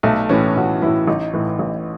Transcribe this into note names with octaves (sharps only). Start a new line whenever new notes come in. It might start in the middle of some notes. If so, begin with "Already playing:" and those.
B1 A3
A2 E3 C#4
B1 F#4
A2 E3 E4
A1 D#4
A2 E3
A1